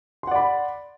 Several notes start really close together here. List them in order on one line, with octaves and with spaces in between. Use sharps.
C6 F#5 D5 B5